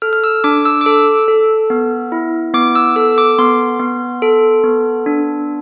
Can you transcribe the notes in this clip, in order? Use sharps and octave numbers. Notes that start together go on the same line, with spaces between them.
A4 F6
F6
E6
D4 D6
E6
D6
A4 E6
A4
B3
E4
B3 D6
E6
A4 E6
D6
B3 C6
B3
A4
B3
D4